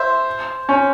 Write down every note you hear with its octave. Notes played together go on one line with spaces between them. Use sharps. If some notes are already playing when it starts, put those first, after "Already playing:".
Already playing: C5 E5
C#4